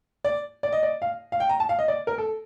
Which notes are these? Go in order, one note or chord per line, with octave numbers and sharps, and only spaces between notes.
D5
D5
D#5
D5
F5
F5
G5
A#5
A5
F5
D#5
D5
A#4
A4